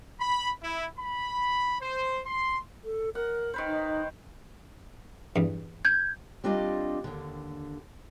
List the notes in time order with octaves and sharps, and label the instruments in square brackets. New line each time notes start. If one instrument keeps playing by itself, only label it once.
[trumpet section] B5
E4
B5
C5
C6
[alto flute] A4
[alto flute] A#4 [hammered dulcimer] F#5
[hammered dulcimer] D#3 B4 C5
[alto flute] D#4
[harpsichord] E2 G2
[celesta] G6 G#6
[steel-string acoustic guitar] G3 C4 D4 F4 D5 D#5
D#2 D3